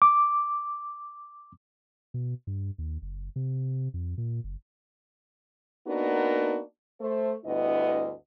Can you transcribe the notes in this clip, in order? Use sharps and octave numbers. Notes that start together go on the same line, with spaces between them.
D6
B2
G2
D#2
F#1
C3
F2
A#2
F#1
A#3 B3 D4 D#4 F#4 A#4
A3 C5
D2 G2 B3 E4 D#5